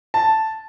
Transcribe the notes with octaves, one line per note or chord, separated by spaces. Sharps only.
A5